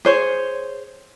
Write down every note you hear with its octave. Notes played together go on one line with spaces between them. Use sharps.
G#4 C5 C#5